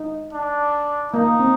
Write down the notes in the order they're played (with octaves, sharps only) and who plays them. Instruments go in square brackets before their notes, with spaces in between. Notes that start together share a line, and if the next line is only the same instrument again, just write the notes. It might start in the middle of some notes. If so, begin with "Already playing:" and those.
Already playing: [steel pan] D#4
[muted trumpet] D4
[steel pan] A#3 [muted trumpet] D#4
[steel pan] C4